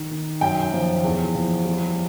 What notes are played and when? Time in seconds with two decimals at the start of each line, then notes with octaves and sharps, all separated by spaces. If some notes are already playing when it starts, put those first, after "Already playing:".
Already playing: D#3
0.10 D#3
0.41 F#2 G5
0.73 F3
1.04 E2
1.35 F3
1.65 G3